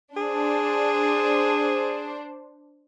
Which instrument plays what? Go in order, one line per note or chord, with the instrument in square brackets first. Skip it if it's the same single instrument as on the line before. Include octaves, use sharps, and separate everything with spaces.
[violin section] D4 C5 [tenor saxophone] G#4